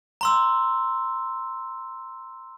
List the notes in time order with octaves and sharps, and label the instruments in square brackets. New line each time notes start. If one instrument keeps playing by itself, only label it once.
[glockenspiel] A#5 C6 E6